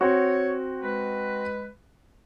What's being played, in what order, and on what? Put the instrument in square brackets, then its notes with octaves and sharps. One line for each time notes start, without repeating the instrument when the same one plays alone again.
[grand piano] C4 F#4 [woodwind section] C#5
[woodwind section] G#3 B4